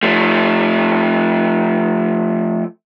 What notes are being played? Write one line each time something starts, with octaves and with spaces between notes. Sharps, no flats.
F3 A3